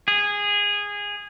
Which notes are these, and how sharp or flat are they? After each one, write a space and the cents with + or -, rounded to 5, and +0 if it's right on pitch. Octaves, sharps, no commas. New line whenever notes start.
G#4 -15